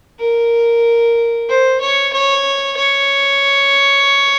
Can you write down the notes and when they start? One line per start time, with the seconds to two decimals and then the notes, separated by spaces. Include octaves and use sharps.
0.20 A#4
1.49 C5
1.81 C#5
2.13 C#5
2.77 C#5